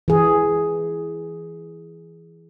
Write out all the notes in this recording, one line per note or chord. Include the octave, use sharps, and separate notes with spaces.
E3 G#4